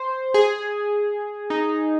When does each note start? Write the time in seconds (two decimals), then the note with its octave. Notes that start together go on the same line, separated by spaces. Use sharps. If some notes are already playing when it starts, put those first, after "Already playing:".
Already playing: C5
0.34 G#4
1.50 D#4